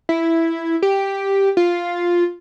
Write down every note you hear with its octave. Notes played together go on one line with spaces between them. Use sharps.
E4
G4
F4